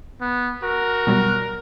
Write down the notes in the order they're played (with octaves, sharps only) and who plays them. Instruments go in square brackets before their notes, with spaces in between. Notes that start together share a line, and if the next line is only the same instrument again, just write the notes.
[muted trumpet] B3
[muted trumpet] F#4 [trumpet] A#4
[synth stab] B2 F#3 G3